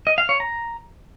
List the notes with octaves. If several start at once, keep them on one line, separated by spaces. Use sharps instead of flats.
D#5
F5
C#5
A#5